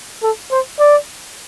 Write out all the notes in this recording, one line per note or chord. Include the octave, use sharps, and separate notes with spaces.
A4
C5
D5